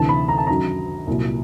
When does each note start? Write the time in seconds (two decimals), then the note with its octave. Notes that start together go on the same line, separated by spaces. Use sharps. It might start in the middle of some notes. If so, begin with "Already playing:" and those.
Already playing: D2 C3 E3 A5
0.09 B5
0.28 A#5
0.38 A5
0.47 F#2 D#3 F#3 A#5
1.07 C2 A#2 F#3